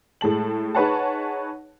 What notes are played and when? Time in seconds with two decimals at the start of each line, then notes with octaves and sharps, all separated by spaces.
0.21 A2 G#3 A5 F#7
0.75 D#4 G#4 B4 C#5 F#5 A5